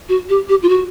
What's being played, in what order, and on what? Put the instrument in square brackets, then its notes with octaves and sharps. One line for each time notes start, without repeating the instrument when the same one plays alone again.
[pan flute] F#4
G4
G4
F4
F#4